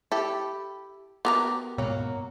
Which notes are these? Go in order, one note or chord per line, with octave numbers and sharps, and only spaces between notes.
E4 G4 A4
B3 F#4 G4 A#4 A#5 D6
G#2 B2 F#3 A#3 F#4